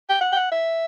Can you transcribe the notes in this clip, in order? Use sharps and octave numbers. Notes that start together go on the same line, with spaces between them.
G5
F#5
G5
F#5
E5